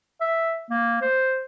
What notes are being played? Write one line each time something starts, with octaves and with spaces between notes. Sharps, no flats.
E5
A#3
C5